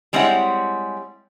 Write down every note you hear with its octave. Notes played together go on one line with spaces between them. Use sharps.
G3 G#3 C4 E4 C#5 F#5